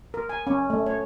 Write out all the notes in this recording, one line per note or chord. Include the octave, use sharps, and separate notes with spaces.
A#4
G#5
C#4
A3
C#5